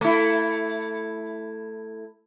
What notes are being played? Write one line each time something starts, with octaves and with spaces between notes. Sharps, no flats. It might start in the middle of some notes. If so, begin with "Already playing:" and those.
A3 E4